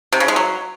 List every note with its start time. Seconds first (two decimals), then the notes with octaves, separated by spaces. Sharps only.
0.12 C3
0.20 C#3
0.28 G#3
0.36 F#3